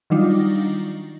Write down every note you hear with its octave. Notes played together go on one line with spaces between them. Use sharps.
D#3 F#3 G3 D4 D#4 F4